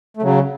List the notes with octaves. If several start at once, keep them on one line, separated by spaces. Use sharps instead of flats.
A3
C#3 F#3